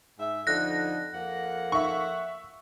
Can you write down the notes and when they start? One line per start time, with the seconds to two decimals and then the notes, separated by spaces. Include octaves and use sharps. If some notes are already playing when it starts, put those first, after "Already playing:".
0.19 G#2 E5
0.47 F2 D3 D#4 F#6 A#6
1.13 F2 A#3 F#5
1.72 E5 C#6